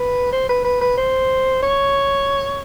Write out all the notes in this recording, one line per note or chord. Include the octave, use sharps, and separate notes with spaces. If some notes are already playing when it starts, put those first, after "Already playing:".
Already playing: B4
C5
B4
B4
B4
C5
C#5